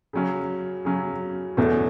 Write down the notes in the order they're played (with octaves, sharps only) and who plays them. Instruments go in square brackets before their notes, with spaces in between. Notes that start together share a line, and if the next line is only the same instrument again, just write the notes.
[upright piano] C#3 F#3 C#4
C#3 F#3 C#4
E2 B2 A3 C#4